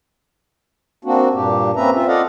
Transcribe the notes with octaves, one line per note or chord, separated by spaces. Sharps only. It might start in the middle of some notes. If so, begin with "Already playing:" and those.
A#3 C4 D4 F#4
G2 A#2 A#3 D4 G4
A#3 C4 C#4 B4 E5 A#5
C4 F4 E5
F4 A4 D5 D#5 F5 F#5